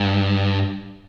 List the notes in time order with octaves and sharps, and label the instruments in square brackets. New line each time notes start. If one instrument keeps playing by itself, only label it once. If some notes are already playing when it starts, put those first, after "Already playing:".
Already playing: [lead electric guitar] G2